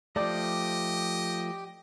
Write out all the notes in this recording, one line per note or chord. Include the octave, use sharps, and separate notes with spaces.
F3 A3 G4 D5 D#5 G5